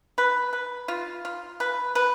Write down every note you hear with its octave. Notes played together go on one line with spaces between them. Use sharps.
B4
B4
F4
F4
B4
B4